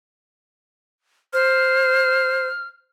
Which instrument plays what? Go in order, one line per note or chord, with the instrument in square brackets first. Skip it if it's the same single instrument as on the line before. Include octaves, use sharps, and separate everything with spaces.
[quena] C5 [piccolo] F6